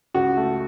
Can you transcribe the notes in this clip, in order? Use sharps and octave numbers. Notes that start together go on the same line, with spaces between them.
C#2 F#4
A3